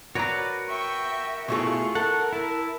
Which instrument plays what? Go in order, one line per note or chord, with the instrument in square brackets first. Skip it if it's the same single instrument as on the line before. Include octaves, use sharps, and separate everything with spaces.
[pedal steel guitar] F#4 A#4 B4 [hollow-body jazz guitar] C#5 A#5 [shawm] D5
[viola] E5 G5 [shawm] C#6
[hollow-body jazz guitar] B2 A3 G#4 [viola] E4 F4 [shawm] C#6
[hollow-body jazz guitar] A4 [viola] A#4 [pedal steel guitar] F#5
[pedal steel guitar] E4 [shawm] A5